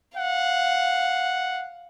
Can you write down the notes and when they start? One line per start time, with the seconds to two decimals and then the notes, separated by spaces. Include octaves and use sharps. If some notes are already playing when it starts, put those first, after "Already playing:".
0.17 F5 F#5